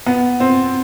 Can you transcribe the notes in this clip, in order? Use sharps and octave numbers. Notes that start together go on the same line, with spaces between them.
B3
C4